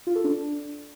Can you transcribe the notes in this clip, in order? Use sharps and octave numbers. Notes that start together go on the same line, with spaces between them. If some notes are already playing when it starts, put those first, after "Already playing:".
F4
A4
D4